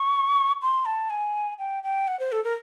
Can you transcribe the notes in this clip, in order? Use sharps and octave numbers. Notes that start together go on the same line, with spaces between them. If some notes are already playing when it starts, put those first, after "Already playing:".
Already playing: C#6
C6
A5
G#5
G5
G5
F#5
C5
A4
A#4